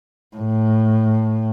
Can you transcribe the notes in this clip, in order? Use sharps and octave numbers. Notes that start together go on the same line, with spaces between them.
A2